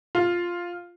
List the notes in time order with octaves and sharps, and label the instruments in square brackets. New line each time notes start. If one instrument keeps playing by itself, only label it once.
[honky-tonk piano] F4